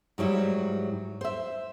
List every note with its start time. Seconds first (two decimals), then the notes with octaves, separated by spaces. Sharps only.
0.18 G#2 F#3 G3 E4
1.21 C5 E5